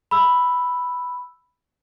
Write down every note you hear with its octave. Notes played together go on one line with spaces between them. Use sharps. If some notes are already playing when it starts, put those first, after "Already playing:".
B5 E6